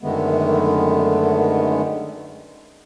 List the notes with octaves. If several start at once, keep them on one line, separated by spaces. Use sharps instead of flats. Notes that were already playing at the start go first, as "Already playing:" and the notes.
F#2 D3 D#3 G#3 A3 B3